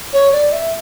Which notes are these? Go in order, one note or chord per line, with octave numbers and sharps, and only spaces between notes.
C#5
D5
E5